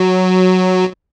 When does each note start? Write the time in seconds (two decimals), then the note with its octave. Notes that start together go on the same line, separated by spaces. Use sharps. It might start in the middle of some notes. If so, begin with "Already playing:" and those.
Already playing: F#3